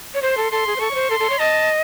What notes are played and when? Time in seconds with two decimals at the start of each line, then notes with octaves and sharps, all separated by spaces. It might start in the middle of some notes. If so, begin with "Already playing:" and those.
0.14 C#5
0.22 C5 C6
0.37 A4
0.51 A4 C6
0.67 G#4
0.76 C5
0.80 A4 C#6
0.91 C#5
0.95 C5
1.10 A4 C6
1.20 A4
1.30 C#5
1.39 D#5 A5